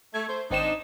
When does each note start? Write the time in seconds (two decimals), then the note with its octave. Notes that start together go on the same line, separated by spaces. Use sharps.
0.14 A3 G#6
0.29 A3 C5
0.51 G#1 C4 D4 D#4 E7